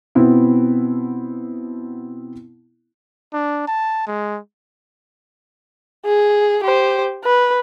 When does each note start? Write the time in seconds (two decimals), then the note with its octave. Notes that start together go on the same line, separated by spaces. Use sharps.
0.15 B2 B3 C4 E4
3.33 D4
3.67 A5
4.07 G#3
6.06 G#4
6.64 G4 C5
7.25 B4